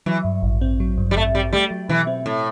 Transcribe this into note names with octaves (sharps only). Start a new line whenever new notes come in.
E3 F#3
G2
A1
C4
F#3
G2
G3
A1 A3
G3 C4
G3 A3
F#3
B2 E3
C4
A2 A3